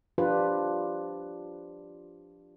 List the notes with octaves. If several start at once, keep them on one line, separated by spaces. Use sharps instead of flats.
F3 D4 F4 G4 B4